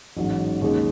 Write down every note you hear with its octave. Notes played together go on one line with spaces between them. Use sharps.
A1 G#2 F#3
D#2 C#3 G#3 D#4